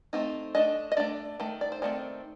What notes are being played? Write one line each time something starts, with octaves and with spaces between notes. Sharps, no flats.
A3 C4 D#4
A3 D4 D#5
D#5
A3 D4 D5
D#3 A3
D5
C5
D#3 A3 C4 D5